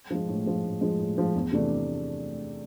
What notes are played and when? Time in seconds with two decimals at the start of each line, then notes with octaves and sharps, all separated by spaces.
0.10 F3 G#3
0.28 A2
0.46 F3 G#3
0.64 A2
0.81 F3 G#3
0.99 A2
1.17 F3 G#3
1.35 E2
1.52 C3 E3 A3 D4